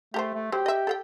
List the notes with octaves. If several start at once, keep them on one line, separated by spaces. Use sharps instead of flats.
A3 G4 A#4 C5
A3
F#3 G4 C5
D#5 E5
A4 F5 G5